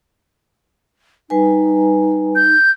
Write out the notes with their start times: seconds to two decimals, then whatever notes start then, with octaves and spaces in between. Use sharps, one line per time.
1.30 G3 D#4 B4 G#5
2.36 G6